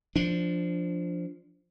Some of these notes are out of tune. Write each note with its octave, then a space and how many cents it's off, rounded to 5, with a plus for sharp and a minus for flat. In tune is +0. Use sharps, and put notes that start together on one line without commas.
F3 +0 D4 -5